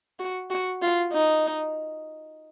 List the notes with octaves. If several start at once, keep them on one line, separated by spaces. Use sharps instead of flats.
F#4
F#4
F4
D#4